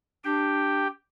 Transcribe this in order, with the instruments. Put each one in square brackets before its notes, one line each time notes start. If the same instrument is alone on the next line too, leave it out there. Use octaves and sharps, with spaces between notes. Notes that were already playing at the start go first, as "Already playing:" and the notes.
[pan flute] D4 [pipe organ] G4 G5